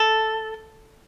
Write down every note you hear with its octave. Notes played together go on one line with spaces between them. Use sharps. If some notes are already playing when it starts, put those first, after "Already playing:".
Already playing: A4